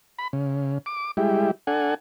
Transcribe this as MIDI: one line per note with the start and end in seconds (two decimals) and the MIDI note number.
0.19 0.28 83
0.33 0.78 49
0.86 1.11 86
1.17 1.51 55
1.17 1.51 56
1.17 1.51 64
1.17 1.51 67
1.67 1.94 62
1.67 1.94 69
1.67 1.94 78
1.67 1.94 80